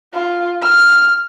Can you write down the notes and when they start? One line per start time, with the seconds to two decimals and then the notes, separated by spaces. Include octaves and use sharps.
0.13 F4
0.61 F6